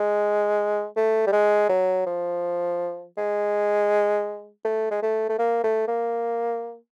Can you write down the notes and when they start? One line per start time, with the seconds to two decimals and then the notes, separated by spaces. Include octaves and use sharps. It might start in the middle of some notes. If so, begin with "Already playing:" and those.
Already playing: G#3
0.96 A3
1.27 G3
1.32 G#3
1.69 F#3
2.06 F3
3.17 G#3
4.65 A3
4.91 G#3
5.03 A3
5.29 A3
5.39 A#3
5.64 A3
5.88 A#3